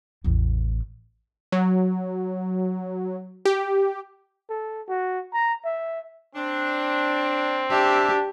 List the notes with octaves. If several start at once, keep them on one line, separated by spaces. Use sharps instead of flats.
A1 E2
F#3
G4
A4
F#4
A#5
E5
C4 D4
D4 G4 E5